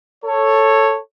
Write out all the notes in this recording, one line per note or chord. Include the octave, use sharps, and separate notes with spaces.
A4 C#5